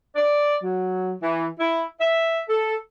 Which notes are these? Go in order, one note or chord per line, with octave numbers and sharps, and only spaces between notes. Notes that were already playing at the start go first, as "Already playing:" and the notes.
D5
F#3
E3
E4
E5
A4